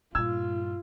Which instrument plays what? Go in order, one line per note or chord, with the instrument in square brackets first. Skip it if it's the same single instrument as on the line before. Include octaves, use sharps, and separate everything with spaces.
[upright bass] G2 A#2 [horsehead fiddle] F4 [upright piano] E6 G#6